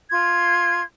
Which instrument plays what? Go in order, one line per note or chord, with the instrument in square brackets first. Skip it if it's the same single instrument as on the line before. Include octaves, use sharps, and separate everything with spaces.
[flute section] F4 C6 G#6